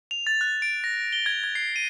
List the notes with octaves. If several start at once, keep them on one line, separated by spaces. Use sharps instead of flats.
F7
A6
F#6
D7
A#6
G7
G#6
G#6
C7
D#7